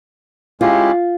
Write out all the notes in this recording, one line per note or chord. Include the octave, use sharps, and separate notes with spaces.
G#3 C#4 E4 F4 G4